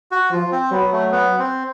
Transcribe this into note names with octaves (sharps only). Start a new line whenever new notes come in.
F#4
F3 F4
C4
F#3 B3
A3
B3
C4